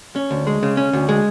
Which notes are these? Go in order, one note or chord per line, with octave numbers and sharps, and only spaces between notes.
C#4
D2
G#3
C#3
C#4
D2
G#3